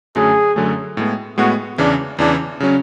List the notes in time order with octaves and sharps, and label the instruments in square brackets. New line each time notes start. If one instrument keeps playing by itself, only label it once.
[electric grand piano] F#2 D3 F#3 A3 [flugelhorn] G#4
[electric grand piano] F#2 D3 F#3 A3
A2 G#3 B3
[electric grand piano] A2 G#3 B3 [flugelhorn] F#4
[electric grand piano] E2 C#3 E3 [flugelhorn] D4
[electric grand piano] E2 C#3 E3 [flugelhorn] D4
[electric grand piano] C#3 F#3 C#4